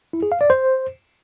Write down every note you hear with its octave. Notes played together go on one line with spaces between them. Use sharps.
E4
G#4
F5
D5
C5